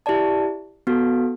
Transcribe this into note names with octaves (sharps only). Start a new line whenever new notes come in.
E4 G4 D5 A5
B3 F#4 A4